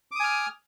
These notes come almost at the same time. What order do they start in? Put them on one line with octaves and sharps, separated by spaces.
D6 D#6 G#5 F6